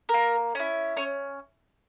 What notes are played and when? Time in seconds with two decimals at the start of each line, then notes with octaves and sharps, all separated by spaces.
0.09 A#4
0.14 A#3
0.55 C#4 E4
0.97 C#4 C#5